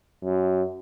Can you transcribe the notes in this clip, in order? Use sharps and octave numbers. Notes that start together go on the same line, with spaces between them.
F#2